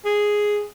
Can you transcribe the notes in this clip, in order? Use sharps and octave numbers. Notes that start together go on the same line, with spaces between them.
G#4